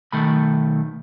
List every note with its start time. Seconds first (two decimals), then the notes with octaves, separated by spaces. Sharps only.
0.13 B1 D#3 A3 B5